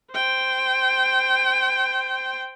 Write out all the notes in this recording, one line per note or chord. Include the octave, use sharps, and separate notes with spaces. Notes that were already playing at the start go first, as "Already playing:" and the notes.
C5 G5